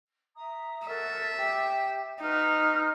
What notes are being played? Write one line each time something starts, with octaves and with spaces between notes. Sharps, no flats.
E5 A#5 D#6
F#4 A4 A#4 E5
G4
D#4 F#4 B4 F6